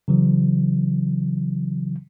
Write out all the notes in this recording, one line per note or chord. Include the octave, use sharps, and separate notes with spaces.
C#3 E3 F#3